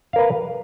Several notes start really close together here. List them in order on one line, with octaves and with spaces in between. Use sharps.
F5 A#4 B4